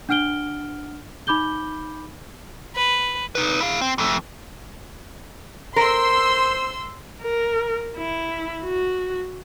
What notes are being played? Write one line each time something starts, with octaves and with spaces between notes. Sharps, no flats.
D4 F#5 F6 D7 G7
D#4 B5 D6 G6 G7
B4
D#4 B4
E4 F5
C4
F2 A3
A#4 C5 C6 E6
A#4
E4
F#4